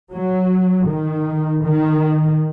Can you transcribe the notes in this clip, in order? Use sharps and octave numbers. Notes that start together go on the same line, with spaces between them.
F#3
D#3
D#3